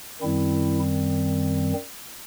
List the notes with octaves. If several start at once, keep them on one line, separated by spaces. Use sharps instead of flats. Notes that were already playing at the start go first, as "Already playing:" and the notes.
F#2 D#3 G3 C4 E4